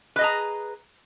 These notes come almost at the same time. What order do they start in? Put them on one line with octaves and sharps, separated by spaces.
B4 D#5 G#4 A#5